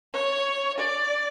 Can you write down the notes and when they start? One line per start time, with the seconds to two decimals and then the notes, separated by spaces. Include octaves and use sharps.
0.13 C#5
0.78 D5